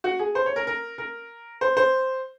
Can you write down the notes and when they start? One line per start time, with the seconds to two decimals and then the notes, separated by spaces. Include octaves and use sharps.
0.04 F#4
0.19 G#4
0.35 C5
0.46 C#5
0.56 A#4
0.67 A#4
0.98 A#4
1.61 C5
1.77 C5